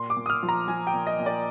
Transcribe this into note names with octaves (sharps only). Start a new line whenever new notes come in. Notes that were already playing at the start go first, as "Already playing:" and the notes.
Already playing: A#2 C6
D6
A#2
D#6
F6
F3
A#5
F3 G#5
G5
A#2
D#5
A#2
D5